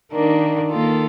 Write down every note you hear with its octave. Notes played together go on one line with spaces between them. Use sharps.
D#3 A#3 D4
D#3 A#3 F4 A4